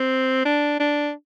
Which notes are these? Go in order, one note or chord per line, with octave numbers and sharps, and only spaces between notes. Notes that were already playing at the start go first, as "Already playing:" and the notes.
Already playing: C4
D4
D4